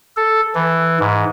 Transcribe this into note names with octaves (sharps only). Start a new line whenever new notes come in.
A4
E3
G#2